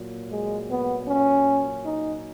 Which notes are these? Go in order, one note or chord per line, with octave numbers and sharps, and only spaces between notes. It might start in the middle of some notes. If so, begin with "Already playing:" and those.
Already playing: A#2 F#3
G#3
B3
C#4
D#4